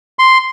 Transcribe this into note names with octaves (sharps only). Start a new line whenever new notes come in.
C6